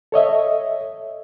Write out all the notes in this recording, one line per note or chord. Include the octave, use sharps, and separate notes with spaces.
A4 C#5 D#5 E5